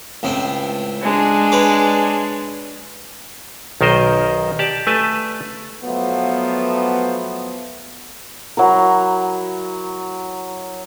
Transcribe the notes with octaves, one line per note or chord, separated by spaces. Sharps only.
C#2 A2 C4
G#3 D4
B4 C#5 D5
B1 D#3 A#4 C5 D#5
G4 D5 A5
A3 B4 G#5 A5
F3 F#3 A3 B3
F#3 E4 A#4